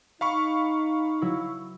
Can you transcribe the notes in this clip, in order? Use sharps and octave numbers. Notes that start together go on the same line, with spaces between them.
D#4 F5 B5 C#6
F#3 E4